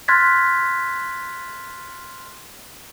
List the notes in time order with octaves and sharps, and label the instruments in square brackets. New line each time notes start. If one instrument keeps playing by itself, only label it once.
[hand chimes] C6 F6 F#6 G#6 A6 B6